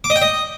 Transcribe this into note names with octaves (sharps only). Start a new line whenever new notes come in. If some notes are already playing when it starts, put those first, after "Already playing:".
D6
D#5
G5
D#5